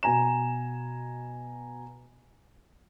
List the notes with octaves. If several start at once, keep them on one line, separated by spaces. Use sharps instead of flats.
B2 G#5 A#5 E7